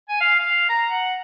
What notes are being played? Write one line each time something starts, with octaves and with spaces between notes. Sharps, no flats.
G#5
F5
F5
A#5
F#5